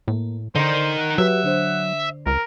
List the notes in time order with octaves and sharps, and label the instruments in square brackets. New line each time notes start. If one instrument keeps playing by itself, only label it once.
[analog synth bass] A2 [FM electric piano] A#3
[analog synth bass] D3 [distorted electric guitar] D#4 A#4 [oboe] C5 [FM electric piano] D5
[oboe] F#5
[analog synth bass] F#3 [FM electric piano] F#4 G4 B4 [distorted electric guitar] E5
[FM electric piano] D3 D4 C5
[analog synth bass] C#2 [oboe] A#4